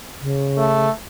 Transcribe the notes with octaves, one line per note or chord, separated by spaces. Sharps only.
C#3
A3